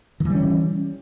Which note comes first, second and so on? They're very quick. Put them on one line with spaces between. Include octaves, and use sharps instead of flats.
D#3 E3 G3 C#4